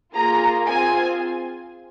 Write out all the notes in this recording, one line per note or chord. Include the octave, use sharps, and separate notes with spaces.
A#3 F4 G#4 A#5
C4 F4 G#4 G#5